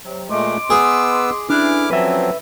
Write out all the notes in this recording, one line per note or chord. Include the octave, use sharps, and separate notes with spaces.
C3 F#3
A#2 G#3 A3 D#5 C6 D6
B3 G#4 B4 E6
D3 E3 C#4 D4 E4 D6 F6
F3 F#3 C4 B4 E5